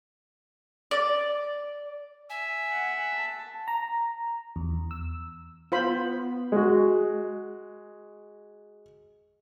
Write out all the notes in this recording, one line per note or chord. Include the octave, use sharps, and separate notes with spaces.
D5
E5 G#5
F#5
A5
A#5
E2
E6
B3 F4 C5 B5
G#3 F#4